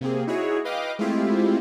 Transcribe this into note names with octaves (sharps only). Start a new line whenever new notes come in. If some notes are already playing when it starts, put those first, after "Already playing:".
C3 A#3 C4 G#4
D#4 E4 F#4 G#4 C#5
B4 D#5 F5 G5 D6
G#3 A3 C4 E4 F4 G4